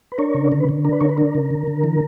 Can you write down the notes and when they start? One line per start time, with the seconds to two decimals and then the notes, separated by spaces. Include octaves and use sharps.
0.12 B4
0.18 D4 A#4 C#5
0.35 C#3
0.52 D3 A#4
0.60 B4
0.69 D3
0.85 D4 A#4
0.93 B4
1.00 D3 A#4 C#5
1.09 B4
1.18 D4 A#4
1.35 C#3
1.51 D3
1.67 D3
1.84 E3